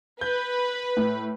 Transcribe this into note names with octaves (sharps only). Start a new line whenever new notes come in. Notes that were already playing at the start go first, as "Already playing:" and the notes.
B4 G6
A2